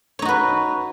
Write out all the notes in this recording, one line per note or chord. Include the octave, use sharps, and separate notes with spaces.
D#4 F#4 B4 C#5